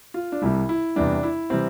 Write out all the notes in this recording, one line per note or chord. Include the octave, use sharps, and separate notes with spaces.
F4
D4
C2 C3 G3 E4
E4
E2 C3 E3 G3 D4
E4
C3 E3 G3 C4